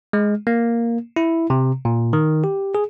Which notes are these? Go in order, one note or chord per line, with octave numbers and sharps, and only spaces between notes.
G#3
A#3
E4
C3
A#2
D#3
G4
G#4